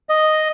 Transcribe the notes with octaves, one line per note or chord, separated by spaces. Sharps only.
D#5